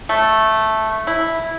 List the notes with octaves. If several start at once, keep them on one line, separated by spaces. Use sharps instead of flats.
A3
E4